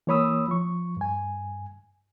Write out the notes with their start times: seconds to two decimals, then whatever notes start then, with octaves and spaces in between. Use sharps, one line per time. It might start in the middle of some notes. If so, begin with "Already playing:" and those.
0.07 E3 A#3 C#5 B5 D#6 E6
0.48 F3 C#6
0.97 G2 G#5